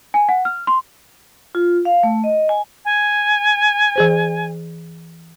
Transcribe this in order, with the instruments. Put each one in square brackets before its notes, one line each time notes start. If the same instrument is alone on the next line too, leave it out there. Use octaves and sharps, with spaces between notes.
[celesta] G#5
F#5
F6
C6
[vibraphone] F4
F5
A3
D#5
G#5
[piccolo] G#5
[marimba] E3 G#4 C5